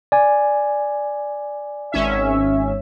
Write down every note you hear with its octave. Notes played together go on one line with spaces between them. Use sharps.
D5 G#5
G#1 C#4 E5